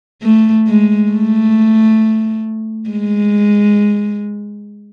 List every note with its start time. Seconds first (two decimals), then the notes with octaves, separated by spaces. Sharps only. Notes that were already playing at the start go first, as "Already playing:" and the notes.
0.22 A3
0.67 G#3
1.12 A3
2.90 G#3